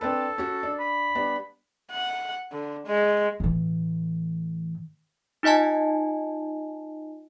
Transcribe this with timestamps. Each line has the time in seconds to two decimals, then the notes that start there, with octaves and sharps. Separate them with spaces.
0.01 C4 D4 A4 B4
0.38 C#4 F#4
0.63 D4
0.80 B5
1.15 G3 B3 D4
1.91 F#5
2.52 D3
2.86 G#3
3.40 A2 E3
5.43 D#4 F4 D#5 G#5 A5